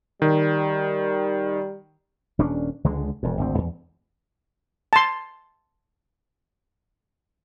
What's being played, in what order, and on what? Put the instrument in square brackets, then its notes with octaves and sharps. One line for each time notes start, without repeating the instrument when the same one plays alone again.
[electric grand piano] D#3 [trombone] G3
[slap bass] D#1 C#4 D4
C#2 D3 G#3
E1 F2
G#1 D2 C4
E2
[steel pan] A5 C6